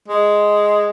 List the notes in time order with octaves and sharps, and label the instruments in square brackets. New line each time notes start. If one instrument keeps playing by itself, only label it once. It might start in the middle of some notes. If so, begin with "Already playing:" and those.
[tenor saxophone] G#3